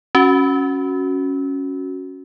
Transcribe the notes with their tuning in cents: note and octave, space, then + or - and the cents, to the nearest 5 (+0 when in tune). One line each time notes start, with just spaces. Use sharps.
C#4 +0 F#4 +0